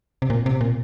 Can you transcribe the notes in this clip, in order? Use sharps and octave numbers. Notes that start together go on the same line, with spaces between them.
C3
A#2
C3
A#2